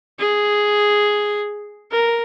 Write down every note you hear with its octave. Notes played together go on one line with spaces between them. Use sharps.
G#4
A#4